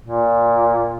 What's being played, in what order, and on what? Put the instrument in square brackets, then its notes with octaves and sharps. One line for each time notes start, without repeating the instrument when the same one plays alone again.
[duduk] A#2